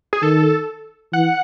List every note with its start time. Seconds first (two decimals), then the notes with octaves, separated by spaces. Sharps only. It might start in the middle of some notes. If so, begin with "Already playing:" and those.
0.13 G#4
0.22 D#3 A4
1.13 E3 F#5